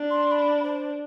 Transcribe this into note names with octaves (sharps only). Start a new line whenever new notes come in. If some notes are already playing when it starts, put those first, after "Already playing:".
Already playing: D4
C6
B5
C5